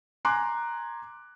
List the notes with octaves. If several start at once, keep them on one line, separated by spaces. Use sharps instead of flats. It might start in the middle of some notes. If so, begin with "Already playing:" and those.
G#5 A#5 C6 D6 F#6